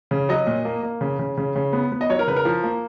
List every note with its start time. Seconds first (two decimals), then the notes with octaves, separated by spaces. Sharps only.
0.11 C#3
0.29 F#3 D#5
0.47 A#2
0.65 A#3
0.83 A#3
1.01 C#3
1.19 C#3
1.38 C#3
1.56 C#3
1.73 B3
1.92 B3
2.01 D#5
2.10 F#3 C#5
2.19 A#4
2.27 C#3 B4
2.36 A#4
2.45 F3
2.63 A#3